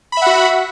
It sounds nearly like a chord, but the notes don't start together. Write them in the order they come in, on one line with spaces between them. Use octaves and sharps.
B5 E5 F#5 F#4